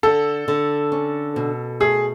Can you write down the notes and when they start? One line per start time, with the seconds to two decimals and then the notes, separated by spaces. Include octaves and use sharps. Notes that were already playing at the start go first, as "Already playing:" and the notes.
0.03 D3 A4
0.48 D3
0.92 C#4
1.36 B2
1.80 A3 G#4